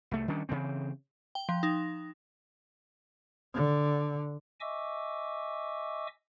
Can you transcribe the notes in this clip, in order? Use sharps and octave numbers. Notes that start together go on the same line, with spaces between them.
C2 A3
D#3 G3 C#4 D4
C#3 E3 C4
G5
F3
D#4
D3
D#5 E5 G#5 C#6 D6 E6